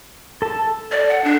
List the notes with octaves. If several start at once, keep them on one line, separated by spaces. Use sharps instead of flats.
A4 A5
D5
F#5
D4